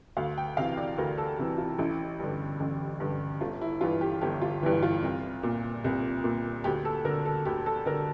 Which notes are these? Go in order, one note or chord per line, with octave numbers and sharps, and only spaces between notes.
D2 F5
G5
C3 E3 F5
D5
D2 A#4
A4
C3 E3
F4
A1 E4
G2 D3
A1
G2 D3
G1 F4
E4
G2 E3 F4
G4
G1 G4
F4
G2 E3 E4
F4
C2
A#2
C2
A#2
D2 G4
A4
D3 A#4
A4
D2 G4
A4
D3 A#4